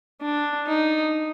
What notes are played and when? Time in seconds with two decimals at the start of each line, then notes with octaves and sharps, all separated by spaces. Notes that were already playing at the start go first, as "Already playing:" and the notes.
0.22 D4
0.68 D#4